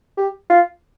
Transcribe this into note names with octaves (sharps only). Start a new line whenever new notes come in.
G4
F4